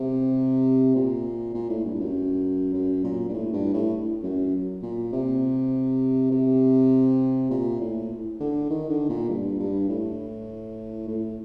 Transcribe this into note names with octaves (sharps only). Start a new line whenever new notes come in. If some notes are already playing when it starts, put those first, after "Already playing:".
Already playing: C3
A#2
A#2
A2
G2
G2
F#2
F#2
A#2
G2
A2
G2
A2
F#2
A#2
C3
C3
A#2
A2
D3
D#3
D3
A#2
G2
G2
A2
A2